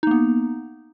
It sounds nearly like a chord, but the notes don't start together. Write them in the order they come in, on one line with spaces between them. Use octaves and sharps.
D#4 A#3 B3